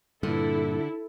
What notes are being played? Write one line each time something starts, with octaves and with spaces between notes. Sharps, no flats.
G2 A#2 D3 E4 A4